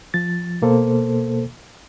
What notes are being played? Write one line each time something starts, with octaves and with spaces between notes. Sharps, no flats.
F3 A6
B2 A#3 A4 C5